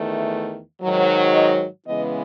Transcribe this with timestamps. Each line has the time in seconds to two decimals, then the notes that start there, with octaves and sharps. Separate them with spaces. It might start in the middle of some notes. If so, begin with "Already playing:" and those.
Already playing: E2 D#3 A3
0.81 G#2 D#3 F#3
1.34 D#5
1.87 C#3 E3 G#3 B3 D#5